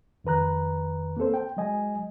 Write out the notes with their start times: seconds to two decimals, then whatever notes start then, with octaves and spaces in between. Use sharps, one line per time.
0.24 F2 D#3 B4 A#5 F#6
1.17 A#3 C4 A4 C5
1.34 G5
1.57 F#3 G#3 D#5 G#5